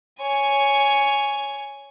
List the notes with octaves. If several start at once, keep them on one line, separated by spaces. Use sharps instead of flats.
C#5 G#5